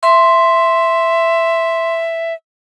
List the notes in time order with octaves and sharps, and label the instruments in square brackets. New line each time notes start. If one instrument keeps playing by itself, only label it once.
[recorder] E5 [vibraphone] C6